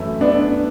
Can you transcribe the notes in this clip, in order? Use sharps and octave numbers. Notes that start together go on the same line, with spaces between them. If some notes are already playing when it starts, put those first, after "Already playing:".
Already playing: F#2 E3 A3 C4 E4
B3 D4